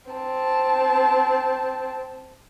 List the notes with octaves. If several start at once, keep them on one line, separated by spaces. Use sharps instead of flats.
C4 A5